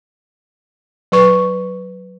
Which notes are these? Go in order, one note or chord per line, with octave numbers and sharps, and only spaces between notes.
F#3 B4 C#6